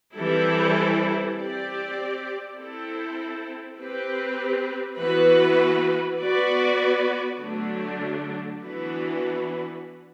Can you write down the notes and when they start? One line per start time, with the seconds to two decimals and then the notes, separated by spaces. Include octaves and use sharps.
0.16 E3 G3 C4 E4 A4
1.37 C4 G4 D5
2.58 C4 E4 A4
3.79 C4 G4 B4
5.00 E3 B3 F#4 B4
6.21 B3 F#4 B4 D5
7.42 D3 F#3 A3 D4
8.63 E3 B3 D4 F#4 B4